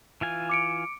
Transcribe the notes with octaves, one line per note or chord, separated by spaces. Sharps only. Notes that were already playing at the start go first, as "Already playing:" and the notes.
E3 F4 G#5
D6 C#7 D7